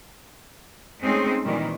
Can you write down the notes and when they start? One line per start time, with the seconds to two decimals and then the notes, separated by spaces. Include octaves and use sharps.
1.02 G#3 A3 C4 C#4 D#4 G#4
1.45 A#2 D#3 E3 G3